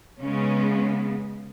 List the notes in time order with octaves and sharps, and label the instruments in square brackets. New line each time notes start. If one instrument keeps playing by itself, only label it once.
[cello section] C#3 G#3 B3 C#4